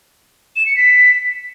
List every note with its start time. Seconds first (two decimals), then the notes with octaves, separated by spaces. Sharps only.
0.56 E7
0.66 C#7
0.76 B6